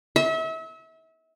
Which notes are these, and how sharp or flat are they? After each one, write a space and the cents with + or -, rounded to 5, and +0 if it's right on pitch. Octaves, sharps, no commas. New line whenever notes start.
E5 -35